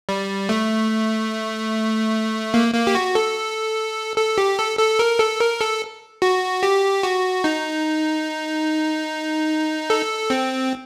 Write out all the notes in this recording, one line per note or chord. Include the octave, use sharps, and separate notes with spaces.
G3
A3
A#3
A#3
G4
F#4
A4
A4
G4
A4
A4
A#4
A4
A#4
A4
F#4
G4
F#4
D#4
A4
C4